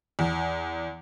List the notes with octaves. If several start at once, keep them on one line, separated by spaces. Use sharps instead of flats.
E2